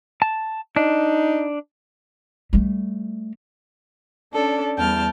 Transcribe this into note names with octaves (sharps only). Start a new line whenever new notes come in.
A5
D4 D#4
G3 A3
C#4 D4 A4 D5
E2 G3 G5 A5 F6